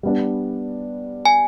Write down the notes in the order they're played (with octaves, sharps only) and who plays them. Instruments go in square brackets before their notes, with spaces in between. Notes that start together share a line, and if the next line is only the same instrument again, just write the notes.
[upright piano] G3 B3 D4
[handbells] G#5